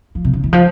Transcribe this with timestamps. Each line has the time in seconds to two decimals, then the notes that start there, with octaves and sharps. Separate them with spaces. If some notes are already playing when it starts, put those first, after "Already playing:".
0.15 F3
0.25 C3
0.33 C#3
0.44 E3
0.53 F3